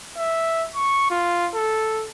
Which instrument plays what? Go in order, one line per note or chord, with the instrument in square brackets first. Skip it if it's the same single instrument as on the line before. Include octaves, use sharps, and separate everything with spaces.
[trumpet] E5
C#6
F4
A4